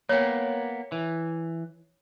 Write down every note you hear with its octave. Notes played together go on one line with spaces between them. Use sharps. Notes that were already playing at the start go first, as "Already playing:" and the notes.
A#3 B3 C#5 G5
E3